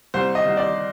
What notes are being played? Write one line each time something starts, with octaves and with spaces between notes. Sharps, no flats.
C2 C5
D#5
C2
D5